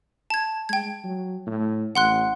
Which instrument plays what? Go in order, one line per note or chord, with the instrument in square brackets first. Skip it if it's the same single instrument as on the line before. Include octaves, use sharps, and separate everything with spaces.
[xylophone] A5 G#6
[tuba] G#3 [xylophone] G5 G#6
[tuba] F#3
A2
[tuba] A1 [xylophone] F#5 C6 F#6